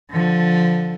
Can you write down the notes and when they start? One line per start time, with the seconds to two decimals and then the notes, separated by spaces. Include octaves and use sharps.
0.11 D3 F3